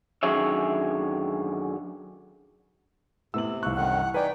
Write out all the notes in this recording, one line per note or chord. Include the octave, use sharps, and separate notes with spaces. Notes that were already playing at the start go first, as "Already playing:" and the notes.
F#2 D3 D#3 G#4 C#5 E5
A2 C3 B3 E6 F#7
C2 E3 F5 C#6 F#6
F#2 A2 D#3 F#5
D#4 B4 D5 G5 G#5